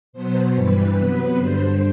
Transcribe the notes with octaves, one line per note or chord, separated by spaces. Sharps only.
B2 F#3 B3 C5
G2 E3 G3 B4
C3 F#3 B3 B4
G2 D3 G3 C5